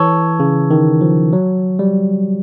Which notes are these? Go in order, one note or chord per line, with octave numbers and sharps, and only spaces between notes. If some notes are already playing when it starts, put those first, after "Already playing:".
Already playing: E3 A4 C#5
C#3
D#3
F3
F#3
G3